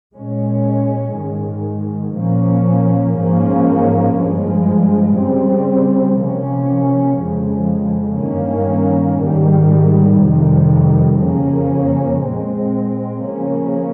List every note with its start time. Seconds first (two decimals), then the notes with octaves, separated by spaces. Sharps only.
0.14 A#2 G#3 C#4
1.14 G#2 D#3 G#3
2.15 A#2 F3 A#3 C#4
3.16 G#2 F3 A#3 C#4
4.16 G2 F3 G#3
5.17 C#3 G3 C4
6.18 C3 F3 A#3 C#4
7.18 F2 C#3 F3 G#3
8.18 G2 D#3 A#3 C#4
9.19 G#2 D#3 G3
10.19 F2 C3 D#3 G3
11.20 F2 C#3 F3 A#3 C#4
12.20 A#2 G#3 C4
13.21 C#3 F3 A#3 C#4